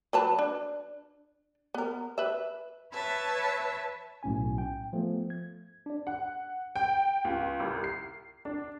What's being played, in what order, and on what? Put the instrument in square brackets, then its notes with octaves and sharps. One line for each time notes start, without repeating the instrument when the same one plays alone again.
[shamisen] F#3 B4 A5
D4
B3 A#4
B4 E5
[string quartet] B4 C#5 E5 A5
[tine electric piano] B1 A2 C#4 G#5
G5
F3 A3 B3 A4
G#6
D4 D5
[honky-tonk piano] F#5
G5
C#2
C2
C7
D4